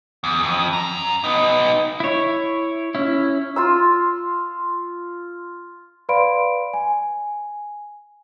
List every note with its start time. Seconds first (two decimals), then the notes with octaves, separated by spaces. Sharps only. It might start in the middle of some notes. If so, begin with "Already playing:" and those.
0.24 E2
0.43 F2
0.73 F#2 A#5
1.24 B3 D#4
2.00 E4 C#5
2.95 C#4 E4
3.56 F4 C6 E6
6.09 B4 D5 F5 B5 C6 D7
6.74 G#5